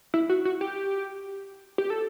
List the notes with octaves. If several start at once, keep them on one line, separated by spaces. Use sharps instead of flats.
E4
F#4
F#4
G4
G4
A4